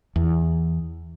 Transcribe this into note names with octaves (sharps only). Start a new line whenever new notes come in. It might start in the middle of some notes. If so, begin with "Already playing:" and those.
E2